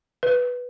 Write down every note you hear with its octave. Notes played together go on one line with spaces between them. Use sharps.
B4